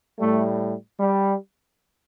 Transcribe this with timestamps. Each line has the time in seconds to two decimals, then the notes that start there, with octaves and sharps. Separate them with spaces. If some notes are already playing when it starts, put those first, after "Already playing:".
0.19 A2 G3 A3
0.99 G3